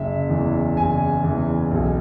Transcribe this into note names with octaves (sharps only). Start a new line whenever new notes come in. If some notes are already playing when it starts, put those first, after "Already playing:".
Already playing: F#1 E5
E2 E3
F#1 G#5
E2 E3
B1